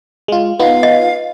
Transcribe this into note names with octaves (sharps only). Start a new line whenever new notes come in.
G#3 F4
B3 D#4 F4 F5
D#5